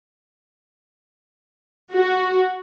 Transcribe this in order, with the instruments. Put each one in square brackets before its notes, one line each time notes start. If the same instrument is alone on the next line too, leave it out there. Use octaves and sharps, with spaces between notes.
[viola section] F#4